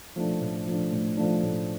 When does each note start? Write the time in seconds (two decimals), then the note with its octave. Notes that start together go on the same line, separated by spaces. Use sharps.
0.16 F3 A3 D4
0.41 A2
0.67 F3 A3 D4
0.92 A2
1.17 F3 A3 D4
1.43 A2